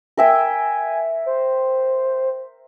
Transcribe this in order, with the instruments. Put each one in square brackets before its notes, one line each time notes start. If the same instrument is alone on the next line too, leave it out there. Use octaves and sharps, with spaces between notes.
[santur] A#4 E5 G5 [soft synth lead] G#5
[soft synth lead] C5